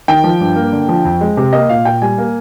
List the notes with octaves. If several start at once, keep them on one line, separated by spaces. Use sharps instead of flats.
D#3 G5
F3
G2
A#3
D3
F3
F2
G#3
C3
A#3 D#5
A#2 F5
A#2 G5
G3 G#5
A#3